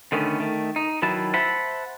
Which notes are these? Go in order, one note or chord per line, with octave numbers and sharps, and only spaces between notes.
D3 D#3 A3 B3 C#4
D#3 A3
D#4
D#3 F#3 E4 B4 A5
C5 E5 F#5 A5 B5